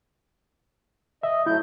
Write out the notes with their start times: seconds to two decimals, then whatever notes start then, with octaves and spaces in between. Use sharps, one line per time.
1.23 D#5 E5
1.46 F#3 A3 E4 G6